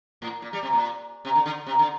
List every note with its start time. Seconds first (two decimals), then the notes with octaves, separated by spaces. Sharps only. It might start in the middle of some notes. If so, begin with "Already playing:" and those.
0.22 A2
0.42 A#2
0.53 G3
0.63 C3
0.73 A#2
1.25 C3
1.35 D3
1.46 D3
1.67 C3
1.79 D3